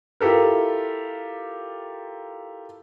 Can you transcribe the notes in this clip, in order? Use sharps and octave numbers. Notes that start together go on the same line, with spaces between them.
E4 F4 G4 A4 A#4